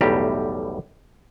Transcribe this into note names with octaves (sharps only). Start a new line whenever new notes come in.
B1 E2 A2 G3 G4 A#5